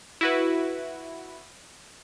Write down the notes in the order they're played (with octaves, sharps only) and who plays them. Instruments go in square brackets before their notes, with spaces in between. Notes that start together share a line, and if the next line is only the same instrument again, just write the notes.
[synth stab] E4 F#4 B4